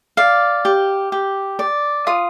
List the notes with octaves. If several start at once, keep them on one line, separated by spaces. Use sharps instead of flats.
D5 F5
G4
G4
D5
F4 D#6